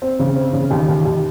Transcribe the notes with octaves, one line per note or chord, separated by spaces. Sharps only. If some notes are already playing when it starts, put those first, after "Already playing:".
C4
C#3
C4
C#3
D#2
D#2
D#2